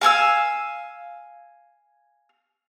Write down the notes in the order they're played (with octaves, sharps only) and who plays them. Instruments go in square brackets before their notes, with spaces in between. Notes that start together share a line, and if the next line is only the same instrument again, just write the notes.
[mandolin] F5 G#5 C#6 E6